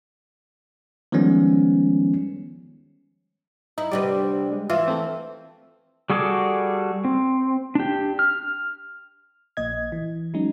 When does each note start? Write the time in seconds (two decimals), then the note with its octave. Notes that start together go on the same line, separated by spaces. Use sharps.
1.12 D#3 F3 G3 G#3 B3 C#4
3.78 D#4 E4
3.91 D2 C3 G3 B4 D5
4.52 G#3
4.70 E3 F4 E5
4.88 A3 C4
6.10 G3 F#4 G#4 A4 D6
7.05 C4
7.75 D4 G4
8.19 F6
9.57 A#1 A#2 D#5 G#6
9.92 E3
10.34 F#3 G#3 C#4 D#4